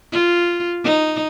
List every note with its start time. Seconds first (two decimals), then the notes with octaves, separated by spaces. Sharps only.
0.12 F4
0.84 D#4